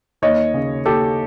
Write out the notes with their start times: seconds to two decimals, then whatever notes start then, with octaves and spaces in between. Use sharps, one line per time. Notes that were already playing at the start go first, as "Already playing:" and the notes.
0.22 D#2 C#5 D#5
0.54 C#3
0.86 D#2 G4 A4